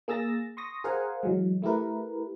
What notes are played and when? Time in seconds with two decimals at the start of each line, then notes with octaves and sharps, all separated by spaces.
0.08 A#3 G#4 E6 A6 A#6
0.57 C6 C#6 D#6 A#6
0.84 G#4 A#4 C5 F5 F#5 G#5
1.23 E3 F#3 G#3
1.62 A3 E4 G4 A#4 B4